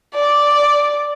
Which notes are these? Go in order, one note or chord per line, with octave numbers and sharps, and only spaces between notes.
D5